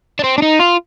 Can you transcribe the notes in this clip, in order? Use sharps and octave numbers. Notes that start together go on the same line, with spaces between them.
D4
C4
D4
D#4
F4